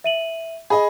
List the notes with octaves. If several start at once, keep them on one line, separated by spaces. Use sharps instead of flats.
E5 D#7 F#7
G#4 D#5 B5